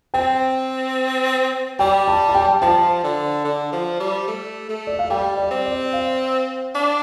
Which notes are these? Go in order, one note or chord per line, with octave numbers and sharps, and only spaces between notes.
C4 G5
G3 G5
A5
A5
G5
F3 A5
D3
D3
F3
G3
A3
A3
D5
F5
G3 G5
D5
C4
D5
F5
D4